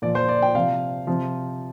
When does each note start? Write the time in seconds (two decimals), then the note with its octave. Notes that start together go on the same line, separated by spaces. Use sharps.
0.02 A#2 F3 D5
0.15 C5
0.28 D5
0.42 G5
0.55 C3 F3 F5
1.07 C3 F3